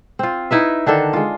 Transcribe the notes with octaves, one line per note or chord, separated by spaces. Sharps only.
C4 F4
D#4 E4 B4 E5
D3 D#3 D4 A4
G#3 F4